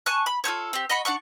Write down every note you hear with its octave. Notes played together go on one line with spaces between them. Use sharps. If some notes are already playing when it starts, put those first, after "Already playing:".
G#5 A5 C#6 F#6
B5
F4 A4 C5 C#5
C4 G4
D#5 F#5 B5 C#6
D4 D5 F#5 C#6